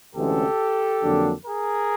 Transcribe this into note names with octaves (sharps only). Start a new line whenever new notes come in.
D2 C3 E3 G#3 C#4 G4 A4
F2 D3 F#3 A#3 D4
G#4 A#4